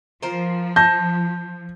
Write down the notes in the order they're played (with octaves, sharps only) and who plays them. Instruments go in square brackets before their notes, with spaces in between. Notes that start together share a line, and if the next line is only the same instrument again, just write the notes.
[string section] F3 [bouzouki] F4 A#4 C5
[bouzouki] A5 [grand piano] G6 A#6